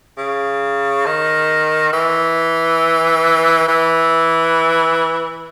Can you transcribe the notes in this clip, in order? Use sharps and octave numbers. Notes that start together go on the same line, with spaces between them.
C#3
D#3
E3
E3